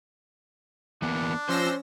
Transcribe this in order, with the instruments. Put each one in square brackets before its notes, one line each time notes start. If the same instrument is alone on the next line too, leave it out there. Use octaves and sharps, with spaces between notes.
[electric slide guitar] E3 A#3 B3 [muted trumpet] D4
[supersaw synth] F3 E6 A#6 [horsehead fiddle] C#4 [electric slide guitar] C5